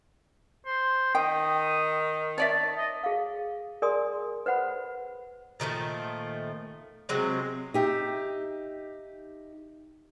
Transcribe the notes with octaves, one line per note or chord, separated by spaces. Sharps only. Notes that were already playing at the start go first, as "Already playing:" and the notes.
C5
D#3 G5 D#6
C#5 D5 E5 A5
D#5
G#4 F5
G#4 A#4 D5 G#5 C6 D#6
B4 C5 F#5 B5
A#2 D#3 F3 A3
C3 F#3 G#3 C4
D#4 G4 E5